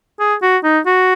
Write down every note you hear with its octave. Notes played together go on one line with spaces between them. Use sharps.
G#4
F#4
D#4
F#4